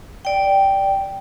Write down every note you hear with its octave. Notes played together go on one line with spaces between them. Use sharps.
D5 G5